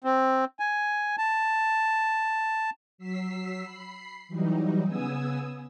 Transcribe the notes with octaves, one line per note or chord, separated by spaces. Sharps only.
C4
G#5
A5
F#3 E6 B6 C7
B5 C7
E3 F#3 G3 D#4
C#3 B3 G#5 D#6 E6